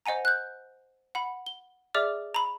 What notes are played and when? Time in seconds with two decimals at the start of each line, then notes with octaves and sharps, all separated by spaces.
0.06 C5 D#5 F#5 G#5 A#5
0.25 F#6 G6
1.15 F#5 B5
1.46 G7
1.94 G#4 D5 E5 D6 F6
2.34 A#5 B5